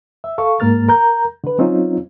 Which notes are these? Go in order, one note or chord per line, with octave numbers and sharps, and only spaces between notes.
E5
A4 F5 C#6
G#2 A#3 A#4 F6 A6
A#4 A#5 G6
D3 B4
F#3 C4 C#4 D#4 F4